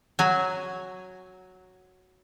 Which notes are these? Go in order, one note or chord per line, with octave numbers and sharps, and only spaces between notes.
F#3 G#5